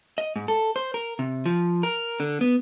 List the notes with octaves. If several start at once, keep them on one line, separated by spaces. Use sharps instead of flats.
D#5
G#2
A4
C5
A#4
C3
F3
A#4
D3
B3